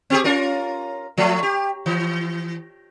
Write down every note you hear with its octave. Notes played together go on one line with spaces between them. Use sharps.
C4 G4 G#4
C#4 F4 A#4
F3 A3
G4
E3